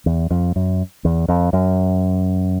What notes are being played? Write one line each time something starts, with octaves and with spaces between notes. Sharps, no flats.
E2
F2
F#2
E2
F2
F#2